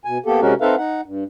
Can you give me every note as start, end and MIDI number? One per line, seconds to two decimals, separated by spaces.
0.05 0.18 47
0.05 0.18 80
0.26 0.40 58
0.26 0.40 59
0.26 0.40 67
0.26 0.40 69
0.41 0.54 48
0.41 0.54 56
0.41 0.54 61
0.41 0.54 66
0.41 0.54 70
0.61 0.75 60
0.61 0.75 63
0.61 0.75 69
0.61 0.75 71
0.61 0.75 76
0.61 0.75 77
0.77 1.01 63
0.77 1.01 78
1.06 1.24 43